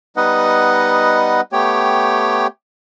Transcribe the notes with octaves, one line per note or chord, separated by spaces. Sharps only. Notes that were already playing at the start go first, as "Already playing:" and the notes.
G3 B3 D#4 B4 D#5 F#5
A3 B3 G4 C#5 G5